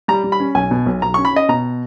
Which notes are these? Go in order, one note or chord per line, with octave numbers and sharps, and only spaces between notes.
G3 A#5
G3
B5
C#4
B1 G#5
B2
B1
B1 A#5
C#4 C#6
B5
C#4 D#5
B2 A#5